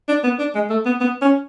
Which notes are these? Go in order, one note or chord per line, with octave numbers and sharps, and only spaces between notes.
D4
B3
D4
G#3
A3
B3
B3
C#4